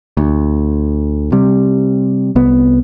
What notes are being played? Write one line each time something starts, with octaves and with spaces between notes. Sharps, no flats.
D2
C3 G3
C2 B3